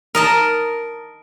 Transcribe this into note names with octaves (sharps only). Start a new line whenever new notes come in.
A#4 D#5 A5